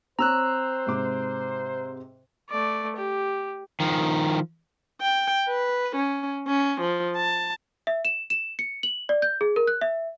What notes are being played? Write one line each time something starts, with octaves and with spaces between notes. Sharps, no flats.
C4 C5 C#5 A#5 E6 F#6
G#2 C3 D6
A3 D5
G4
D#3 F3
G5
B4
C#4
C#4
F3
A5
E5
E7
E7
C#7
F#7
D5
G6
G#4
A#4
F#6
E5